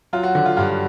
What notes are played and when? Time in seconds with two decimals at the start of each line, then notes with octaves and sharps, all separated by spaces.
0.13 F#3 F4
0.23 F#4
0.35 D3 F#4
0.46 F4
0.57 G2 F4